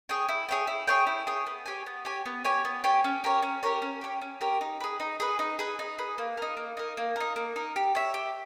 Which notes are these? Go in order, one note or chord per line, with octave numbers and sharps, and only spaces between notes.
G#4 C#5 G5
E4
G#4 C#5 G5
E4
G#4 C#5 G5
E4
G#4 C#5 G5
B3
G4 C#5 G#5
B3
G4 C#5 G#5
B3
G4 C#5 G#5
B3
G4 C#5 G#5
C#4
G4 A#4 C#5
C#4
G4 A#4 C#5
C#4
G4 A#4 C#5
C#4
G4 A#4 C#5
D#4
G#4 B4
D#4
G#4 B4
D#4
G#4 B4
D#4
G#4 B4
A#3
D#4 A#4
A#3
D#4 A#4
A#3
D#4 A#4
A#3
D#4 A#4
G4
C#5 E5
G4